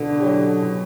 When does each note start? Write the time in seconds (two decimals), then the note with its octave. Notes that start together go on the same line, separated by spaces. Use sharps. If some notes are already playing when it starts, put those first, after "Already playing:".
Already playing: B2 D3
0.20 F#3 C#4 G4
0.62 B2